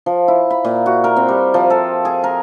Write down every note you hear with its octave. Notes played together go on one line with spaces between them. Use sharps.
F3
E4
B5
A#2
F#4
A#4
C4
G3
F3
A4
G#4
A#4